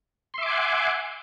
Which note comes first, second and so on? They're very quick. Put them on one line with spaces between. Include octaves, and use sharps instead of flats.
C6 E5 D6 G#5 F#5